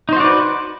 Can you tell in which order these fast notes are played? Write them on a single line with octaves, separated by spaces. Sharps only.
D#4 C5 F#4 D5 B4